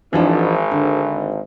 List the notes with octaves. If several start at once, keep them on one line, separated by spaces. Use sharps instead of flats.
G#1 E3 F3 D4
D3